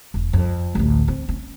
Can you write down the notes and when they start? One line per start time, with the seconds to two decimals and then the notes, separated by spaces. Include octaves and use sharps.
0.14 E1
0.33 F2
0.75 A1 D2
1.08 C4
1.29 C#4